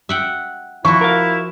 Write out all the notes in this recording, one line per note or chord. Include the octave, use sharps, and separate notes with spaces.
E5 F#5 G5
F3 E4 F#4 C#6
A#4 F5